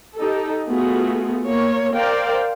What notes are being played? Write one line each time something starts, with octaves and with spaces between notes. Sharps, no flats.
D#4 G4 A4
A3 B3 F4 F#4 G#4
A#3 C#5
A#4 C5 D5 F5 G5